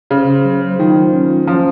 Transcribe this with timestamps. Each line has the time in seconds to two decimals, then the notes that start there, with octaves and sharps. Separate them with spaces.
0.11 C#3 C5
0.27 C5
0.45 F#3
0.62 C5
0.79 D#3 F4
0.96 C5
1.13 C#4
1.30 F4
1.47 F3 C#4